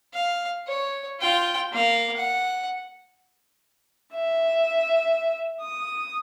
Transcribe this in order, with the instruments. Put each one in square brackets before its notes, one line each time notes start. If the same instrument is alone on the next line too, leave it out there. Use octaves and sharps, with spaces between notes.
[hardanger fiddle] F5
C#5
F4 G5
A#3 F5
F#5
[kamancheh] E5
D#6